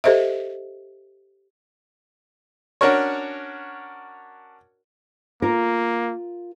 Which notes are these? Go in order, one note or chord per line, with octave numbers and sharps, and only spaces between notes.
G4 A4 C5 D#5 E5
C#4 D4 F#4 A#4 C#5
A#3 F4 A#4